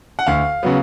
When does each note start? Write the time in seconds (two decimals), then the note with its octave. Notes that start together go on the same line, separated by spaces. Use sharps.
0.19 F#5
0.27 D2 F5
0.63 C#3 F#3 B3